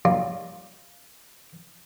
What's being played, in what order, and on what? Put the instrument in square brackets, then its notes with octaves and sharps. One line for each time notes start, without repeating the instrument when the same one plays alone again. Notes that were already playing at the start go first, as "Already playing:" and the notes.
[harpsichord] F#3 G3 A#3 D4 D#4 F4